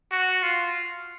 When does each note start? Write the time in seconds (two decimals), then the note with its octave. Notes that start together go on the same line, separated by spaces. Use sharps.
0.12 F#4
0.43 F4